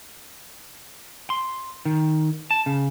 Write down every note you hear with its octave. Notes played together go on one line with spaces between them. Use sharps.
C6
D#3
A5
C#3